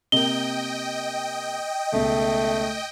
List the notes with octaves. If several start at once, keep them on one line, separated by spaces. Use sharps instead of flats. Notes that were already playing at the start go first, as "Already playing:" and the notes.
C3 A#3 D#5 G5 G7
C#2 B2 A3